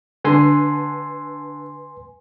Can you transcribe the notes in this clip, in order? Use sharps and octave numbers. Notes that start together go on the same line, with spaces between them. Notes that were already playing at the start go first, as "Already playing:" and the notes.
D3 B4 G#5 C6